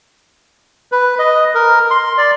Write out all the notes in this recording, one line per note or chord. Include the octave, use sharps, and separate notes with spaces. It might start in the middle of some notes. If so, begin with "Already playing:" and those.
B4
D#5
A#4
C6
D5